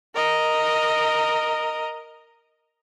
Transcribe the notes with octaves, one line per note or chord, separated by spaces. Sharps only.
A#4 D#5